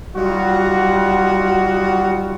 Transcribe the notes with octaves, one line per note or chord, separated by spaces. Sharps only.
F#3 G3 D#4 F4 F#4